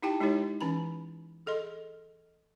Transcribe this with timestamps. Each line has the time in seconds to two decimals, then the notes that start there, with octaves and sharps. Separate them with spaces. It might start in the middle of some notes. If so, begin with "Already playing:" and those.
0.02 D#4 E4 G4 G5 A5
0.20 G#3 D#4 E4 G4 C#5
0.61 E3 C#4 A#5 B5
1.46 G#4 A4 D#5 C6